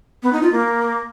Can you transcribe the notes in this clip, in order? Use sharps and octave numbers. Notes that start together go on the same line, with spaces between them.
B3
D#4
F4
A#3